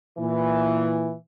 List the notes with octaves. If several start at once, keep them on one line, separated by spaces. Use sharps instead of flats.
A#2 E3